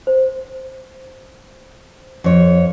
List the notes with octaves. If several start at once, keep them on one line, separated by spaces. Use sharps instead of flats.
C5
F2 C#5